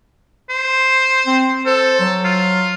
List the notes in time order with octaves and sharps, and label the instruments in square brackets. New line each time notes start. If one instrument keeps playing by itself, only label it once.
[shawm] C5
[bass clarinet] C4
[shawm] A4 [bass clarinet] C5
[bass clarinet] F#3
[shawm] F4